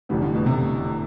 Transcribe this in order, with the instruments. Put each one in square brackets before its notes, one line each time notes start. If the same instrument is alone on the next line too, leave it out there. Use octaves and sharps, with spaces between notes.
[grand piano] F1 E2 D3 G3 B3 [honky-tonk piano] A2
[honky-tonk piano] A2
B2
C3